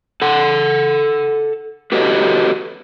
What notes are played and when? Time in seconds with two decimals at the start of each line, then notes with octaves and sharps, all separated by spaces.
0.22 A4 F#5
1.92 F#4 G4 A4 B4 C#5 D#5